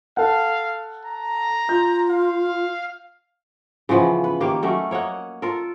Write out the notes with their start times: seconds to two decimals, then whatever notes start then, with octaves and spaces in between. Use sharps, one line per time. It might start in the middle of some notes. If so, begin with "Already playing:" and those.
0.17 A4 F5 F#5
1.05 A#5
1.69 F4 G6
2.10 F5
3.89 C#3 E3 F3 B3
4.24 B4
4.40 D#3 A#3 G4 F5
4.62 F#3 A3 C#4 A#4
4.91 A#3 C#5 D#5 F#5
5.42 F4 A4 A#4